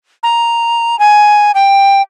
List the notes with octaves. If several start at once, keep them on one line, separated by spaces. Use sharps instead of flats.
A#5
G#5
G5